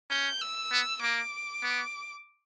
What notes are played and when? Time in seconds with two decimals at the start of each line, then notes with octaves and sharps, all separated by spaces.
0.10 C#4 G6
0.41 E6
0.72 B3
1.02 A#3 D6
1.63 B3